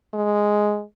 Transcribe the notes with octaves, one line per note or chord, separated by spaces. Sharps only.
G#3